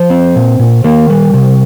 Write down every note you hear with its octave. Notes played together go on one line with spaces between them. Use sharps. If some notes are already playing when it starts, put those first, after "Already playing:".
Already playing: F3 C5
C4
A#2
A#2
D#3 A#3 A#4
G3
C3